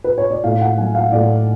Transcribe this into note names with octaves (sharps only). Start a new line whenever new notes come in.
B4
C#5
D5
A2 F5
F#5
F#3 G#5
F5
A2 D5